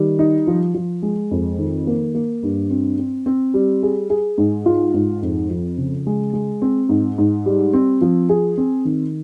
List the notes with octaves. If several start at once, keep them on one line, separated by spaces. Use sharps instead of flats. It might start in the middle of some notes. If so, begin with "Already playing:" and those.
Already playing: D#3 G3
D#4
F3
F3
G#3
F2
D#3
A#3
A#3
G2
C4
C4
C4
G3
G#4
G#4
G#2
F4
G#2
F2
F3
C#3
G#3
G#3
C4
G#2
G#2
G3
C4
F3
G#4
C4
D#3